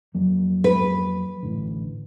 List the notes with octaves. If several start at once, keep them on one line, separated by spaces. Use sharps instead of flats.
F2 F#3 A#3
B4
A1 A2 D3